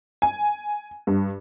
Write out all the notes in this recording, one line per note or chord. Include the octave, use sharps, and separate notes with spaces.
G#5
G2